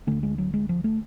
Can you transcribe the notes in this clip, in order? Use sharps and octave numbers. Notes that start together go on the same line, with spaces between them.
D2 D3 A3
G#3
F#3
G#3
F3
A3